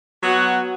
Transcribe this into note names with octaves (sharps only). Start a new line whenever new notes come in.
F#3 B3 F#4